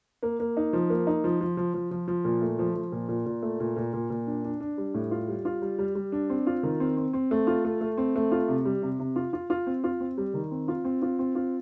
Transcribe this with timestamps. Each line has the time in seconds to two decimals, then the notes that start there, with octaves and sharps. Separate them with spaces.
0.23 A#3
0.40 A#3
0.57 D#4
0.73 F3
0.90 A#3
1.07 D#4
1.24 F3
1.41 F3
1.57 F3
1.74 F3
1.91 F3
2.08 F3
2.25 A#2
2.42 A3
2.59 F3
2.76 F3
2.92 A#2
3.09 A#2
3.26 A#2
3.43 A3
3.60 A#2
3.77 A#2
3.93 A#2
4.10 A#2
4.27 D4
4.44 D4
4.60 D4
4.78 G3
4.94 A2
5.11 F4
5.28 G3
5.45 F4
5.62 G3
5.79 G3
5.95 G3
6.12 D4
6.30 C4
6.47 F4
6.63 D#3
6.80 C4
6.97 C4
7.13 C4
7.31 A3
7.47 F4
7.65 A3
7.81 A3
7.98 C4
8.16 A3
8.32 F4
8.48 C3
8.65 G3
8.82 C3
8.99 C3
9.16 F4
9.33 F4
9.50 F4
9.67 C4
9.84 F4
10.00 C4
10.18 G3
10.34 D#3
10.51 C4
10.68 F4
10.85 C4
11.02 F4
11.19 C4
11.35 F4